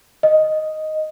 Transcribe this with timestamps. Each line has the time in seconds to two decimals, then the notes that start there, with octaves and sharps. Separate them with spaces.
0.23 D#5